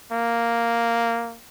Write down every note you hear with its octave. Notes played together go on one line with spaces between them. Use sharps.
A#3